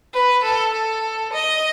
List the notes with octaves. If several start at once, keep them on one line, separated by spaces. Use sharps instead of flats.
B4
A4
A4
D#5